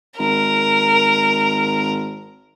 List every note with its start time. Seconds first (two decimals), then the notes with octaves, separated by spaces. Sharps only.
0.19 G#1 A#4